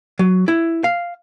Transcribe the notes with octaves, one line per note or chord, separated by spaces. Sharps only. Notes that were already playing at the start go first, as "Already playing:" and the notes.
F#3
E4
F5